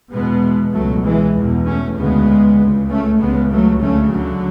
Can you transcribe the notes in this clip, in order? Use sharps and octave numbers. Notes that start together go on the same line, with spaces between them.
E2 B2 G#3 B3
C#2 B2 F#3 A3
E3 G#3
E2 B2
A3 C#4
D2 C#3 G#3 B3
C#2 C#3
A3 C#4
C#2 C#3 G#3 B3
F#3 A3
D2 C#3 A3 C#4
D3 F#3